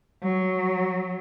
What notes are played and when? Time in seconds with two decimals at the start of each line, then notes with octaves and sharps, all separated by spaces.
0.22 F#3